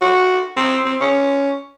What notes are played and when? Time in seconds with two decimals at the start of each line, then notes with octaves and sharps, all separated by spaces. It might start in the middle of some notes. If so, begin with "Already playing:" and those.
0.01 F#4
0.57 C4
0.85 C4
1.00 C#4